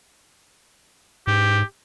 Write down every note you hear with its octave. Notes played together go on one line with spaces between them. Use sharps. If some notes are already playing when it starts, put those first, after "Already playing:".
G#2 G4